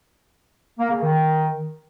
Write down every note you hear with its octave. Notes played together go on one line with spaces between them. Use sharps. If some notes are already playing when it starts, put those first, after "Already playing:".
A#3
C#3
D#3